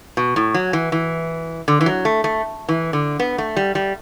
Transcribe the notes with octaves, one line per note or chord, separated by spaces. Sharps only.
B2
A2
F#3
E3
E3
D3
E3
F#3
A3
A3
E3
D3
B3
A3
G3
G3